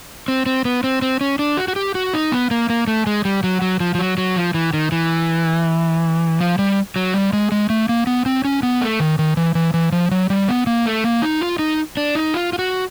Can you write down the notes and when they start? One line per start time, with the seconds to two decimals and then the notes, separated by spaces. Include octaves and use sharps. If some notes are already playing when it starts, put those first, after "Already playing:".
0.28 C4
0.46 C4
0.65 B3
0.84 C4
1.02 C4
1.21 C#4
1.39 D4
1.57 F#4
1.68 F#4
1.76 G4
1.95 F#4
2.14 D#4
2.32 B3
2.51 A#3
2.70 A#3
2.87 A3
3.07 G#3
3.25 G3
3.44 F#3
3.62 F#3
3.80 F3
3.95 F3
3.99 F#3
4.18 F#3
4.36 F3
4.54 E3
4.73 D#3
4.92 E3
6.41 F3
6.59 G3
6.96 F#3
7.14 G3
7.33 G#3
7.52 G#3
7.70 A3
7.89 A#3
8.07 B3
8.26 C4
8.45 C#4
8.63 B3
8.81 A3
9.00 D#3
9.19 D#3
9.37 E3
9.55 E3
9.74 E3
9.92 F3
10.11 F#3
10.30 G3
10.49 B3
10.67 A#3
10.86 A3
11.04 A#3
11.22 D#4
11.41 F4
11.59 D#4
11.97 D4
12.15 D#4
12.34 F4
12.53 F4
12.59 F#4